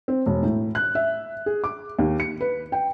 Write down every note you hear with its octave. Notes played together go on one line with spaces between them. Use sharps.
C4
E1
A2
F#6
E5
G#4
D6
D#2
C#7
B4
G5